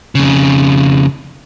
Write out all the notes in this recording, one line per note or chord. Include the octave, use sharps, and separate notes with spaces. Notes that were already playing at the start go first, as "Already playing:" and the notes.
F2 C#3